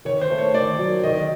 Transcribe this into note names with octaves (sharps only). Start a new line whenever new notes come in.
D#3 C#5
C5
A3
C#5
D#3 D5
F#3
D#3 D#5